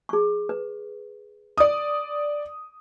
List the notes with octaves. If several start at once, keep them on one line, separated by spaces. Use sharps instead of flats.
G#4 C#6
B4
D5 D#6